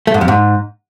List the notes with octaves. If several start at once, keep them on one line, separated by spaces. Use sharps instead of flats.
A3
G#2
F2
G#2